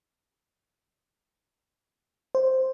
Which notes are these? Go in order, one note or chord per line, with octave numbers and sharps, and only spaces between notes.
C5